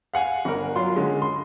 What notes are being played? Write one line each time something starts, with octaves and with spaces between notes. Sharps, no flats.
F5 F#5 G#5
G1 A#4
F#3 F4 C6
D3 G#3 C#4
C6